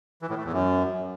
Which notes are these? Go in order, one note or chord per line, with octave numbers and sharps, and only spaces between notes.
E3
A2
A3
E2
F#2